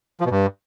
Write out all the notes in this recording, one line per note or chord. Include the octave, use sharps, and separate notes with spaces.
F3
B2
G2